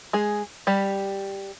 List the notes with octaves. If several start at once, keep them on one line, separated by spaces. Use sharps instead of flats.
G#3 G#4
G3 G4